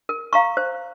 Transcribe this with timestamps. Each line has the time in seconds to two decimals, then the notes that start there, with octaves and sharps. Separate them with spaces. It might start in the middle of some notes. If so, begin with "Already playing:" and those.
0.09 A#4
0.33 F5 A#5 C#6
0.57 C5